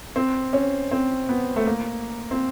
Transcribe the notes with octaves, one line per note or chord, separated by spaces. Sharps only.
C4
C#4
C4
B3
A3
A#3
C4